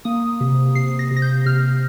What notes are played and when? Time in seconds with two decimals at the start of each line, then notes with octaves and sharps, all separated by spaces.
0.05 A#3 D#6
0.41 C3
0.75 C3 C7
0.88 C7
0.99 A#6
1.11 C3
1.16 A#6
1.22 G6
1.46 C3 F6